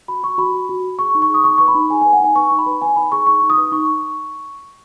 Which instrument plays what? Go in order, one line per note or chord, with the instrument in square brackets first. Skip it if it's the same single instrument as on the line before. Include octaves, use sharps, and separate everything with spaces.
[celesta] F#4 B5
F#4 C#6
F#4 B5
F#4
F#4
F#4
G#4 C#6
D#4
C#6
G#4 D#6
D#4 C#6
B4 C#6
B5
D#4
G#4 G#5
B4 G#5
F#5
D#4 G#5
B4 C#6
D#4
B5
B4
B4 G#5
D#4 B5
G#4 C#6
D#4 C#6
D#4
D#6
B4
D#4 C#6